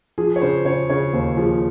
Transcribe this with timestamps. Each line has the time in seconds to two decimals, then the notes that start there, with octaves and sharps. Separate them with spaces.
0.18 F3 G#4
0.36 C#5
0.42 C#3 C5
0.65 C#3 C#5
0.90 C#3 C#5
1.13 D#2 C5
1.37 F3 G#4